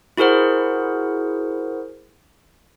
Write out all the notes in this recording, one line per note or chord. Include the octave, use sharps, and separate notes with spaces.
E4 F#4 G#4 A#4 C5 F#5